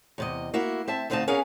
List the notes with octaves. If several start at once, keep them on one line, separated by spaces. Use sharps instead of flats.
E2 C3 D#5
A#3 E4 F#4
C4 E5 A5
D2 B2 C4 D#4 F5 A5
B3 C#4 G#4 A#4 F5 F#5